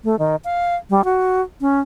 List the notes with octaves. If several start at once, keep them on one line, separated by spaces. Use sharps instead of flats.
A3
D#3
F5
G3
F#4
C#4